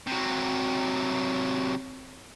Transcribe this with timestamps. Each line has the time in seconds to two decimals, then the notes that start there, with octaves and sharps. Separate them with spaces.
0.07 C3 F#3